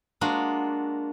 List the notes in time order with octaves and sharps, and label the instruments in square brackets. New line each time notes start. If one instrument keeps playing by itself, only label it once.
[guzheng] G#3 A#3 D4 F4 F#4